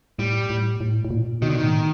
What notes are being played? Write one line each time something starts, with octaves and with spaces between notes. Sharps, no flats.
A2 G3
A2
A2
A2
A#2
B2 D#3
D3
A2 D#3